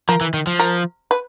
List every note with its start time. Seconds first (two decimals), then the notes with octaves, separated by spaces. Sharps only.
0.09 F3 A#4
0.21 E3
0.34 D#3
0.47 F3
0.60 A#4
1.11 B4